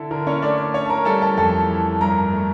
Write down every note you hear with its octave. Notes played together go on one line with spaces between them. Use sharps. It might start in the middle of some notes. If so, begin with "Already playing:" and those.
Already playing: D3 E4 A4
D3 A#4
C#4 C#5
A3 D4 D5
D4 D5
C#4 C#5 C#6
A5
A#4 A#5
G3 A4 A5
A4 A5
F2 A4 A5
E3
G2 A#4 A#5
A3